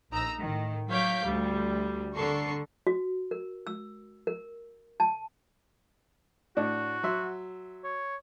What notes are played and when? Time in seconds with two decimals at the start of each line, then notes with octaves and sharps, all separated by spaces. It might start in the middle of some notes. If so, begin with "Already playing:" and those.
0.11 A#1 D#4 A#5 E6 A#6
0.39 A2 D#3
0.91 F#3 C#5 F5 D6 G6 B6
1.26 D2 G3
2.15 D3 D4 A4 A#4 C#6 C7
2.87 F#4
3.31 A#4
3.67 E6
4.27 A#4
5.00 A5
6.57 A2 D4 F#4
7.03 F#3 E5 C6
7.84 C#5